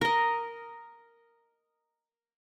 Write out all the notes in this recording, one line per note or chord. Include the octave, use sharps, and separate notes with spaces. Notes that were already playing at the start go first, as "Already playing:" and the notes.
A#4 D#5